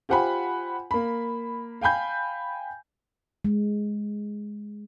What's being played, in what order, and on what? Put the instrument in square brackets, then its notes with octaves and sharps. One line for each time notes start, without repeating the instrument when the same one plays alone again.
[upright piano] F4 G4 C5 F#5 G#5 B5
A#3 B5
F5 G5 G#5 B5 G6
[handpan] G#3